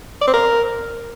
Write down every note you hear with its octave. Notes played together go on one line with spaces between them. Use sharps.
D5
C4
A#4